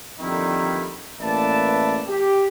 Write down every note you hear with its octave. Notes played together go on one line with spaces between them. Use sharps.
F2 D3 D#3 G3 A#3 E4
A1 A#3 B4 D5 E5 A5
G4